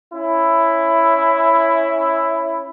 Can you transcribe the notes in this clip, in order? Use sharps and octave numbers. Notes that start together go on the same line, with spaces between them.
C#4 E4